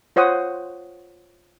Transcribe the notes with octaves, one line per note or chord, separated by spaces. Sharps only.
F4 C5 C#5 F#5 D#6